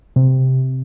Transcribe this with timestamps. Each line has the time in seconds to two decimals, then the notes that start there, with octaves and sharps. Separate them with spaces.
0.16 C3